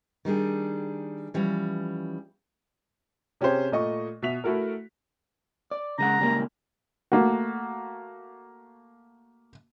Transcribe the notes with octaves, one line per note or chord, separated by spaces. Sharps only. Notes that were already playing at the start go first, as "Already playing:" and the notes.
D#3 G3 D4 G#4
E3 F3 G3 C#4
C3 C#4 G4 G#4 C5
A#2 A3 D#5 C#6
B2 E5 B6 F7
A3 E4 F#4 A4 A#4
D5
C#3 G#3 F#5 A#5
C#2 G3 A#3
A3 A#3 F#4